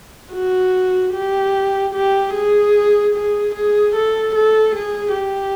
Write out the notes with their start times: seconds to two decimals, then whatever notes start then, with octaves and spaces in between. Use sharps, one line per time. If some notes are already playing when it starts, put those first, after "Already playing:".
0.32 F#4
1.13 G4
1.94 G4
2.34 G#4
3.15 G#4
3.55 G#4
3.95 A4
4.35 A4
4.76 G#4
5.16 G4